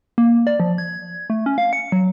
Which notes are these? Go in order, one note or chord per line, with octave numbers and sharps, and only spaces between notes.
A#3
D5
F3
G#6
A3
C#4
F5
C#7
F#3